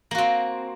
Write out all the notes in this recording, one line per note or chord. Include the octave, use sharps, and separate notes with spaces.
A#3 C4 F#4